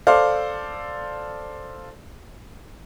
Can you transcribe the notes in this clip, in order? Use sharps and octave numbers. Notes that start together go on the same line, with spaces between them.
A4 C5 D5 F5